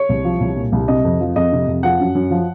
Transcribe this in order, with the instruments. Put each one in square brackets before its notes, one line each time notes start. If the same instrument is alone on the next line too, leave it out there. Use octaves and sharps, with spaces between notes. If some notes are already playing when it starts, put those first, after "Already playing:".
Already playing: [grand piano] C#5
C2
F3
C2
A#2
C2
C3 D#5
F2
F3
F2 D#5
C3
F2
F3 F#5
F#2
F#2
F3